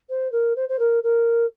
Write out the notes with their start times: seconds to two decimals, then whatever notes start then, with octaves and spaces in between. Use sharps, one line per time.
0.09 C5
0.31 A#4
0.56 C5
0.68 C5
0.78 A#4
1.03 A#4